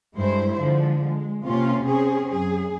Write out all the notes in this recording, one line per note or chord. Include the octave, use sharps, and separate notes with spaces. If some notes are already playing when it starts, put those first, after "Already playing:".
G2 G#3 A3 E4 C5
D3 F3 G#3
G#3
C3 A#3 C#4 F4
C4 C#4 G#4
F#2 G#4